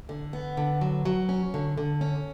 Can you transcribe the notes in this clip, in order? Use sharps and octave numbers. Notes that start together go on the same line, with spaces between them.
D3
B3
D3
F#3
F#3
C#4
D3
D3
C#4